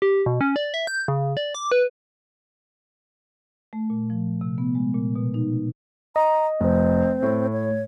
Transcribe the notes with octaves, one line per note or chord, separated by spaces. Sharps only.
G4
B2
C#4
D5
E5
G6
C#3
D5
D6
B4
A3
A#2
F3
C3
B3
G#3
A#2
B2
D#4
D#5 A#5
F1 C4
A2 A3
C#5